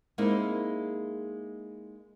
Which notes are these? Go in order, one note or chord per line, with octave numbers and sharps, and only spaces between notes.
G#3 A#3 C4 D#4 E4